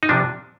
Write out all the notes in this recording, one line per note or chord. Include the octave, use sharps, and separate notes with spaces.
D#4
C3 F3 D4